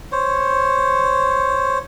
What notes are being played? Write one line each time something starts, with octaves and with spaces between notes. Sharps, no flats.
C5 C#5